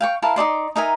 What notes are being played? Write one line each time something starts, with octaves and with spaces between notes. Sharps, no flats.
F5 G5 C#6
E4 A#4 F5 A5
D#4 A4 D5 C6
D#4 A#4 E5 G#5